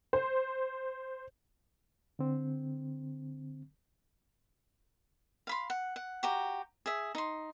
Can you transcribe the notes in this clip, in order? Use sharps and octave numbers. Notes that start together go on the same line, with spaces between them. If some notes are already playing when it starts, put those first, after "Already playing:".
C5
D3 C4
F5 B5 C6
F#5
F#5
F#4 G4 A#5
G#4 E5
D#4 C6